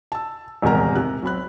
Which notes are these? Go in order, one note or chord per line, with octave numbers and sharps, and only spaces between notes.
A5 E6
D#1 E2 G#2 C3 A#4 A#5
C3 F#6
B1 C4 B5 F#6